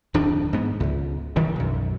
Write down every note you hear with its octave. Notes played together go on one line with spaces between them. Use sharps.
D1 F2 D#3 D4
G#2 B3
C#2
D#3 E3 G3
B1 F#2